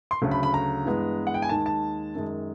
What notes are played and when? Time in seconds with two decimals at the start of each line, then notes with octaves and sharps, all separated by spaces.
0.11 C6
0.22 D2 C#3 F#3 A3
0.31 B5
0.43 B5
0.54 A#5
0.85 G2 E3 G#3 B3
1.27 F#5
1.34 G5
1.42 G#5
1.49 D#2 D#3 G#3 A5
1.66 A5
2.15 F#2 D#3 G#3